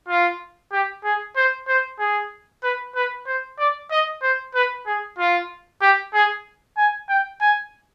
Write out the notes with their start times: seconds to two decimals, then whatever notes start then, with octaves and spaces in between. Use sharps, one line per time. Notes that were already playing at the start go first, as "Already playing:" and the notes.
0.08 F4
0.72 G4
1.04 G#4
1.36 C5
1.68 C5
1.99 G#4
2.63 B4
2.95 B4
3.27 C5
3.59 D5
3.91 D#5
4.22 C5
4.55 B4
4.87 G#4
5.19 F4
5.82 G4
6.14 G#4
6.77 G#5
7.09 G5
7.41 G#5